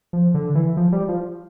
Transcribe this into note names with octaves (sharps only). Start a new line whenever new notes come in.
F3
D3
E3
F3
G3
F3